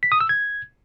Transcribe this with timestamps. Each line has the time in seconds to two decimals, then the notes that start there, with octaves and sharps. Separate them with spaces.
0.03 B6
0.12 D#6
0.21 E6
0.29 G#6